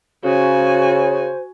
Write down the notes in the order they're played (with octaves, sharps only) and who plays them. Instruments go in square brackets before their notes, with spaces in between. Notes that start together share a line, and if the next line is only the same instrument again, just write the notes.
[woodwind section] C#3 [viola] F#4 G#5 [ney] C5